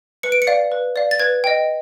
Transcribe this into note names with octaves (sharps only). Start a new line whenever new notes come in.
B4 C#7
D7
C#7
D5 F5
B4
D5 F5
A6
B4 G#6
D#5 G5